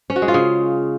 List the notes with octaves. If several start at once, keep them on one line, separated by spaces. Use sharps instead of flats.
C#4
F#4
G#3
F4
C#3